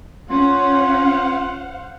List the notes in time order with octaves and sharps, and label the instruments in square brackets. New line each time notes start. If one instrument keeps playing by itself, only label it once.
[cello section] C#4 [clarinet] F4 [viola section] C5 F5 F#5